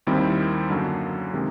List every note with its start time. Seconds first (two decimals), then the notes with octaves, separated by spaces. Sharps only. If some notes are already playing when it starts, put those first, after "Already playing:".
0.07 D#2 D#3 G3 C4 E4
0.70 F#2 D3 F#3 A#3
1.33 C3 D#3 G#3